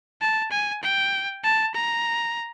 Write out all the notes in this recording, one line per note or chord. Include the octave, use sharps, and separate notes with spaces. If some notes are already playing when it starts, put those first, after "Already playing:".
A5
G#5
G5
A5
A#5